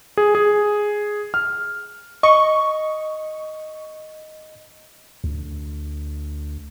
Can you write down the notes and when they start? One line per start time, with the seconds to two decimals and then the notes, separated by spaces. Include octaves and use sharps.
0.17 G#4
0.35 G#4
1.34 F6
2.23 D#5 C#6
5.24 D2